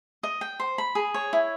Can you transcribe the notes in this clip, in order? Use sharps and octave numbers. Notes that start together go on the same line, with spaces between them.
D#5
G5
C5
B5
G#4
C#5
E4